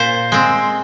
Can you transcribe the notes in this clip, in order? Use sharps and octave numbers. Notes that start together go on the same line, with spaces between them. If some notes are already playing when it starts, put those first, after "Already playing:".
Already playing: A#2 C5
G#3 C4